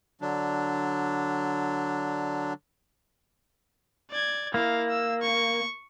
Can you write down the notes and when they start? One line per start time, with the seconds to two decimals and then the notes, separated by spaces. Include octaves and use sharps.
0.21 D3 F#3 D4
4.11 D5 G#6
4.54 A#3 E4 F5
4.89 E6
5.22 C#6